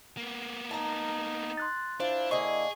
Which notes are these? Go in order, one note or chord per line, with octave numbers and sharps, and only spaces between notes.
A#3 B3
D#4 A5 A#5
C6 F#6 A6
D4 E4 F4 C5
D3 A#3 G#4 D#5 C#6